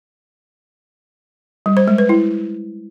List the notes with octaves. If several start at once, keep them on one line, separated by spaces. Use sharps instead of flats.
G3
C5
G#3
B4
E4